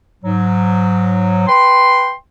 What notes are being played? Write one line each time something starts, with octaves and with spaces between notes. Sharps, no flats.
G#2 F#3
B4 G5 C6